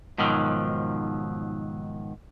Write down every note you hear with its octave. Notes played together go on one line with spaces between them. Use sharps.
G#2 B2 D#3 F3 F#3